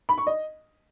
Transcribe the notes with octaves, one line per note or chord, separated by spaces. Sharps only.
B5
C#6
D#5